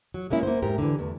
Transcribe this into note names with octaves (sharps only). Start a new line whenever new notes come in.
F#3
G#3 A#3 C#4 E4
A#3 B3 C5
G#2 G4 A#4
D3 E3
E2 A3